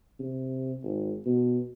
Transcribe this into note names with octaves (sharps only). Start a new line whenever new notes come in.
C3
G#1
B2